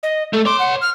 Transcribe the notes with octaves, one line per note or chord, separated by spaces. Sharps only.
D#5
A3 A4
C#5 C6 D6
F#5
F6